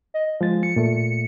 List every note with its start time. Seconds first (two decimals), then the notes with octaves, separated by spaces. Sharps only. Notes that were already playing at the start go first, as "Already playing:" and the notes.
0.14 D#5
0.41 F3 G#3 A6
0.63 C#7
0.76 A#2 A3